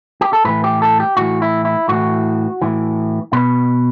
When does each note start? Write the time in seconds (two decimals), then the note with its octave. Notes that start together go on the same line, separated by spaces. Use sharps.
0.21 G4
0.33 A4
0.45 A2 E3 B4
0.64 G4
0.82 A4
1.00 G4
1.17 A2 E3 F#4
1.42 E4
1.65 E4
1.88 A2 E3 F#4
2.62 A2 E3
3.33 B2 B4